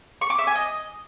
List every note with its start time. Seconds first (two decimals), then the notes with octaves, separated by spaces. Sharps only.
0.21 C#6
0.30 D6
0.38 E5
0.47 G#5
0.56 D#5